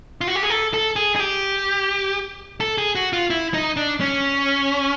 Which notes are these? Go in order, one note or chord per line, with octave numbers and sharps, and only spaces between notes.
F4
F#4
G4
G#4
A4
A4
G#4
G#4
G4
A4
G#4
F#4
F4
E4
D#4
D4
C#4